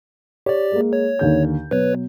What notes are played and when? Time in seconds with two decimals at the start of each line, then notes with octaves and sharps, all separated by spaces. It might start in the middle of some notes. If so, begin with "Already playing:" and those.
0.46 G4 C#5 D5
0.72 G#3 A#3
0.93 C#5
1.19 D#2 D3 G6
1.71 B2 F#3 B4 C#5